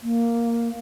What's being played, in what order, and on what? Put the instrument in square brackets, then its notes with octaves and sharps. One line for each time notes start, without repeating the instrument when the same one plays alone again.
[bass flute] A#3